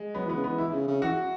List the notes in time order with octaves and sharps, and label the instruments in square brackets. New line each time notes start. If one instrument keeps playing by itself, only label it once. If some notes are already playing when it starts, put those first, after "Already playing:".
Already playing: [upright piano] G#3
[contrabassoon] F#3 [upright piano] B3
[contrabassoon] E3 [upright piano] B3
[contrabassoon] C#3
[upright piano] B3
[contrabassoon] E3
[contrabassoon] E3 [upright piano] E4
[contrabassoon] C#3
C#3
[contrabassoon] E3 [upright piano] F#4